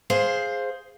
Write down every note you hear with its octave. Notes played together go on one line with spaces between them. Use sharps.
G#4 C5 F5